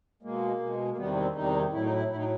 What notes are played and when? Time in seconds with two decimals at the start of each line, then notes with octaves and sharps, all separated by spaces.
0.22 B2 G#3 A#3
0.60 B2 G#3
0.91 A#3
0.97 E2 C3 D#3 G3 B3
1.16 C4
1.34 E2 C3 D#3 G3 D#4
1.71 A2 F#3 E4
1.82 D#4
1.92 E4
2.09 A2 E4
2.14 F#3 D#4